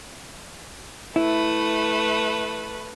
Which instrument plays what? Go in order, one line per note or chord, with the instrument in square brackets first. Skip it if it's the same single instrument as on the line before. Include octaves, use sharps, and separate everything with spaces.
[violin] A3 B4 [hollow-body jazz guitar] E4